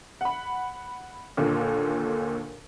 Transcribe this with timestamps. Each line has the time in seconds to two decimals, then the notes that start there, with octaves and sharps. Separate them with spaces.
0.21 F#5 B5
1.37 D#2 A#2 D3